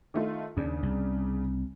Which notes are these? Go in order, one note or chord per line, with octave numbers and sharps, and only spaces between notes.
D#3 A3 F4
D#2 C#3 D4
C2